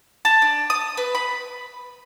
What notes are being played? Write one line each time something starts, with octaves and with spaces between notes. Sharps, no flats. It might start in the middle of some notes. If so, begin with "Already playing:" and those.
A5
D4
D#6
B4
B5